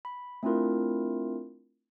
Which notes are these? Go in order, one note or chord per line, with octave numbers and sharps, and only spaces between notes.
B5
A3 C4 D4 E4 F4 A#4